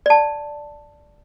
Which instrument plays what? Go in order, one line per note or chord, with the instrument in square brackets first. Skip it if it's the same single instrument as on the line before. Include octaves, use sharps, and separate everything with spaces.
[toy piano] D5 A5